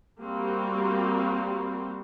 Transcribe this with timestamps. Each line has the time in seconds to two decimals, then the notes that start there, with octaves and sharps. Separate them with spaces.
0.21 G3 A#3 C4 F#4 G4